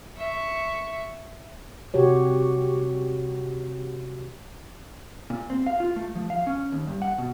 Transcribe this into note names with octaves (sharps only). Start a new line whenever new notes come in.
E5 C#6
C3 F#4 G4 C#5
A#2
C4
F5
F4
A3
F3
F5
C#4
D#2
G2
F#5
B2